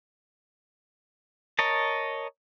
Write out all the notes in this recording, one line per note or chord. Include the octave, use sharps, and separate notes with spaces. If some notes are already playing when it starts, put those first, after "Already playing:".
A#4 C#5 D#5 A5